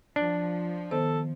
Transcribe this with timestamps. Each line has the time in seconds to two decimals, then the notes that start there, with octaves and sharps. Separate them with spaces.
0.16 F3 D4
0.91 D#3 B3 A4 C5